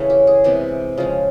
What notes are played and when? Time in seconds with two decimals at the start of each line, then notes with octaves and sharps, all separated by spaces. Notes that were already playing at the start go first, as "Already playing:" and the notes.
Already playing: C#3 E3 A3 C#4
0.10 G4
0.27 G#4
0.44 C3 E3 G#3 B3 G4
0.97 C#3 F3 G#3